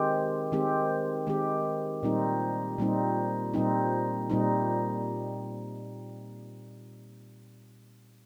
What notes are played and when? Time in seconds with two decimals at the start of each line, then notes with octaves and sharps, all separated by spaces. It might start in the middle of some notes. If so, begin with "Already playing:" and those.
Already playing: D#3 G#3 C4 G4
0.52 D#3 G#3 C4 G4
1.27 D#3 G#3 C4 G4
2.03 A#2 G3 C4 D#4
2.78 A#2 G3 C4 D#4
3.54 A#2 G3 C4 D#4
4.30 A#2 G3 C4 D#4